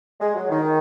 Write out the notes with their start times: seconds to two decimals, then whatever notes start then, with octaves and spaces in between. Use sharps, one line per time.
0.20 G#3
0.35 F#3
0.50 D#3